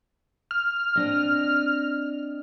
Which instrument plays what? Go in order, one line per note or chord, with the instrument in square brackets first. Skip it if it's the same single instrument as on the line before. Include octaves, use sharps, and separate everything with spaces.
[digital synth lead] F6
[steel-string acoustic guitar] C4 D4 D#5